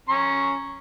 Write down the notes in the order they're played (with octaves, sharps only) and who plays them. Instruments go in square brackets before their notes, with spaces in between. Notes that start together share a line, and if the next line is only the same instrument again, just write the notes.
[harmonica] C#4 A#5 C#6